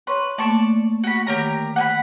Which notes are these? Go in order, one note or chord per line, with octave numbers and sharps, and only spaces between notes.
B4 C#5 C6 C#6
A3 A#3 D5 A5 C#6
F#4 B5
D3 D#3 G4 A#4 C#5 A#5
F#5 G#5 B5